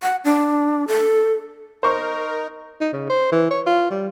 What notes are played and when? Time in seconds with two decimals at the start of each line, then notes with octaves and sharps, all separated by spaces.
0.03 F#5
0.25 D4
0.88 A4
1.83 D#4 A#4 C5 C#6
2.81 D#4
2.93 C#3
3.09 C5
3.32 E3
3.50 C#5
3.66 F4
3.91 G3